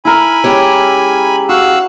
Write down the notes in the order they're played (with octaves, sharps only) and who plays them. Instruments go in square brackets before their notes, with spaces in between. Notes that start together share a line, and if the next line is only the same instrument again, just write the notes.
[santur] E4 A#4 [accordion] G#5 B5
[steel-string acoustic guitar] G#3 C#4 G4
[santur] F#4 [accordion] F5 E6 F#6